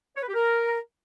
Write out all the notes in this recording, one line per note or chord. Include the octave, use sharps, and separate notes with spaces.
C#5
B4
G4
A#4